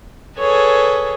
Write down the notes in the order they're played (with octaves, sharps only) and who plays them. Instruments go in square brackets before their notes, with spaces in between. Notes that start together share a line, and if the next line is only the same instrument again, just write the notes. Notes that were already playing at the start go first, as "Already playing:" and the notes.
[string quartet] G#4 A4 B4 C#5